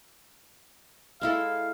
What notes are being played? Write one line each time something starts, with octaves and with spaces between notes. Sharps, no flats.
G#3 E4 A4 F5